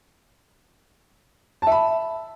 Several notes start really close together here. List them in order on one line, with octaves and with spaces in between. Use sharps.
A5 E5 B5